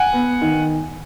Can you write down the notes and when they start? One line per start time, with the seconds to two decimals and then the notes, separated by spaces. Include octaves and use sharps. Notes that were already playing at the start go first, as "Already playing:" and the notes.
Already playing: F#5 G#5
0.13 B3
0.42 D#3